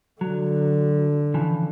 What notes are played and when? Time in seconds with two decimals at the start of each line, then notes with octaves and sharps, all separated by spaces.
0.21 D3 F#3
1.34 C#3 E3 F3